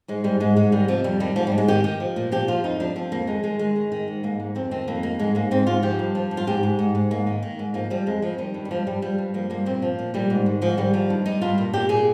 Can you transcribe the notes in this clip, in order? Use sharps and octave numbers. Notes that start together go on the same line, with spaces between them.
G#2 G#3
G#2 G3
G#2 G#3
G#2 G#3
D#3 G3
C3 F3
F2 G3
D#3 G3
G#2 F3
G3
G#2
G#3
D#3 G4
D#3 G4
F3
A#2
F3 G4
F3 F4
F2 D#4
F3 D4
F3 C4
F2 A#3
D#3 G#3
D#3 G#3
D#3 G#3
D#3
D#3
G#2
G#2 A#3
G#2
F2 C4
D#3 C4
F2 A#3
D#3 A#3
G#2 G#3
G#2 A#3
G#2 C4
G#2 F4
F3 G4
G2
F3
G2
F4
G#2 G4
G#2
G#2
G#2
G#2 A#3
D#3
D#3
G#2
F3 A#3
F3 G3
F2 G#3
F2 F3
D#3 G3
G2
G3
G2 F3
G2 G3
F3 G3
G2
F3 A#3
G2 A#3
A#2 C4
F3
A#2
A#2 G3
G#2
D#3
G#2 F3
D#3 G3
F3
G2
G2 D#4
G2 F4
A#2
A#2 G4
A#2 G#4